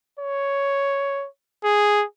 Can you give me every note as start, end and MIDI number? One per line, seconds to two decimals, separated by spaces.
0.19 1.27 73
1.64 2.04 68